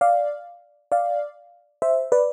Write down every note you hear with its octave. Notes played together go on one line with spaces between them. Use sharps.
D5 F5
D5 F5
C5 E5
B4 D5